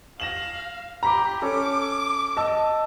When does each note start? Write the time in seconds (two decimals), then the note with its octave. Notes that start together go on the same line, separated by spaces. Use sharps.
0.20 F5 A#6 E7 F#7
1.03 G4 A#5 B5 D6
1.42 C#4 A4 D6
2.37 D#5 A5 E6